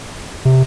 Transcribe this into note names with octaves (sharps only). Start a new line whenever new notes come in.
C3